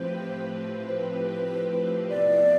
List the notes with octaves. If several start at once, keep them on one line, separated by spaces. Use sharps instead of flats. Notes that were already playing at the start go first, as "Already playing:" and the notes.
Already playing: A2 F3 C4 G4 B4 C5
B4
C3 F3 B3 E4 D5